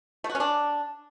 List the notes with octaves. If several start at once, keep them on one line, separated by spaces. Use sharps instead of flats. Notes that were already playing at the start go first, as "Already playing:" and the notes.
A3
F#4
C#4
D4